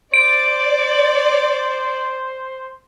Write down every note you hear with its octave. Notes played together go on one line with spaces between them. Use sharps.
C5 D5 D7